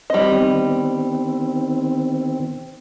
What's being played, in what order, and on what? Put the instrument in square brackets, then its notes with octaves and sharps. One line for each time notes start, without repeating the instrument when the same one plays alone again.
[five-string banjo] G3 D#5 [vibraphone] C4 [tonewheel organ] C5
[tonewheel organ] D#3 C4 [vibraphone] B3 G5